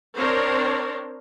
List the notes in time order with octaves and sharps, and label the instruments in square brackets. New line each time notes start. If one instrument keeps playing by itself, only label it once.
[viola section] C4 D4 A#4 C5 C#5